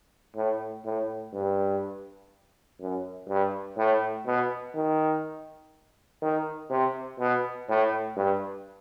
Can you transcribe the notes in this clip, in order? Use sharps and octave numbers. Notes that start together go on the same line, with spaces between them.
A2
A2
G2
F#2
G2
A2
B2
D#3
D#3
C3
B2
A2
G2